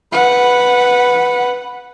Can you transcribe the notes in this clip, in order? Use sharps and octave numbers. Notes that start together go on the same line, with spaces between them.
B4 F#5